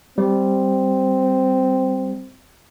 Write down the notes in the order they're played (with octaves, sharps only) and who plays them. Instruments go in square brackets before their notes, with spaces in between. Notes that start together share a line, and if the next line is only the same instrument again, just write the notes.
[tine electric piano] G3 [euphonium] C4